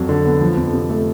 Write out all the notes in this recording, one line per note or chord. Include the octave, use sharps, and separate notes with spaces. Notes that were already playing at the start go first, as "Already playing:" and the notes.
Already playing: F2 F#3
D3
B3
F3
F2
C3
A3